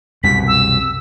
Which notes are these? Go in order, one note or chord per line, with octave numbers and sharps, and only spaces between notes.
C2 F#2 B2 B6
E6